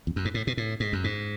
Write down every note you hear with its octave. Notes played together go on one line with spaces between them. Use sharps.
E2
F#2
G#2
A2
B2
A2
G#2
F#2
G#2